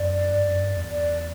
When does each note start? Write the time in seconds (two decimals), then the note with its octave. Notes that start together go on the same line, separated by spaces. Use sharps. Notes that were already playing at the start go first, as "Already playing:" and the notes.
Already playing: F#2 D5
0.32 G2
0.47 F#2
0.62 G2
0.77 E2
0.90 D5